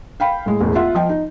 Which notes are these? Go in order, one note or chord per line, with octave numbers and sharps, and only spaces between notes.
F5 G5 B5
A2 G#3
E1 A1 E2
F4 E5 F#5
F3 D#5 G5
D#4